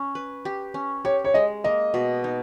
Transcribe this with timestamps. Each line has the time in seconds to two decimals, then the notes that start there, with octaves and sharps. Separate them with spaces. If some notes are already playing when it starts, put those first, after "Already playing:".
Already playing: C#4
0.15 B4
0.45 G4
0.74 C#4
1.05 G4 C#5
1.24 C#5
1.34 G#3 D#5
1.64 A#3 D#5
1.94 B2
2.24 D#4